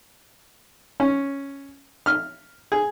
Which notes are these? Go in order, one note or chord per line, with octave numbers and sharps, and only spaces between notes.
C#4
F6
G#4